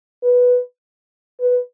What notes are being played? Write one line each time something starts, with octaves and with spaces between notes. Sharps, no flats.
B4
B4